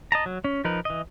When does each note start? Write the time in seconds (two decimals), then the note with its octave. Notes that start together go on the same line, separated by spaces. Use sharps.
0.12 D#5 A5 A#5
0.26 F#3
0.44 C#4
0.64 F3 D#4 A#4 B4
0.85 E3 D#5